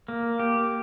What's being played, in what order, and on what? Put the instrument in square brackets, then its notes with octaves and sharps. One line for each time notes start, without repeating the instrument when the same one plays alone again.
[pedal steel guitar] A#3
G4